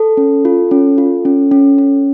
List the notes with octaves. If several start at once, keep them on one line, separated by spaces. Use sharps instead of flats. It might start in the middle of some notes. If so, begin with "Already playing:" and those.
Already playing: A4
C#4
F4
C#4
F4
C#4
C#4
C#4